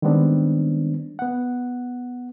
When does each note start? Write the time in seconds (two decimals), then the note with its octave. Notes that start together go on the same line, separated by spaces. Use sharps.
0.02 D#3 G3 G#3 B3 C4 D4
1.19 B3 F#5